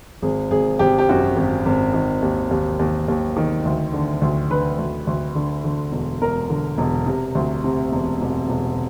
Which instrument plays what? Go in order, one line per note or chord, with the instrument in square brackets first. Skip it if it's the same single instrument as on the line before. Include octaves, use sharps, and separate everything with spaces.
[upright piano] G#1 G#4
G#1 G#4
G#1 G4
G4
F#2 F#4
G#1
G#1
D#3
D#2
D#2
D#2
D#2
D#3
D2
D3
D2
D3 B4
D2
D2
D3
D3
E1
E1 A#4
D3
E1
C3
D2
C3
E1
E1
E1